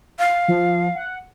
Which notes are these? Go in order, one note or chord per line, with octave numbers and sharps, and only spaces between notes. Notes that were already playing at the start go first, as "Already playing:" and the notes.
F5
F3
F#5